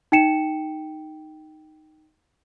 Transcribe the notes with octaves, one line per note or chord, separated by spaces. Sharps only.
D#4 G5 C#7 E7